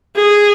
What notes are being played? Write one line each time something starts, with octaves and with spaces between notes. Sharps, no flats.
G#4